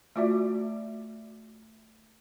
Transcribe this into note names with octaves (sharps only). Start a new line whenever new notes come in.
A3 F4 F#4 D5 E5